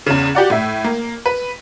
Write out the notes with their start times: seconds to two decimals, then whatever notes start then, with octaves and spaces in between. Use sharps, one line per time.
0.06 E2 C#3
0.35 F#4 G4 D5 F#5
0.50 A2 E5
0.84 A#3
1.26 B4